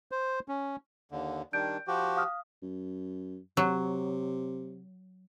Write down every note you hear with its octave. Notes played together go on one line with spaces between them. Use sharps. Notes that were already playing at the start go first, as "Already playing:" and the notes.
C5
C#4
D#2 D3
D#3 G3 D4 G6 D7
F3 F#4 G4
F5 D#6 F6
F#2
C3 F#3